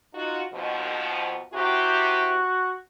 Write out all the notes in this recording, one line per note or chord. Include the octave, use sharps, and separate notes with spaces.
D#4 F4 F#4
D#2 B2 F3
C3 E4 F#4 G4